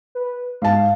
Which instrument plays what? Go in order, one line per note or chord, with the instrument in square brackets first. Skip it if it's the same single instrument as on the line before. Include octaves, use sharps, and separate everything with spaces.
[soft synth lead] B4
[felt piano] G#2 A5 [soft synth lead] F5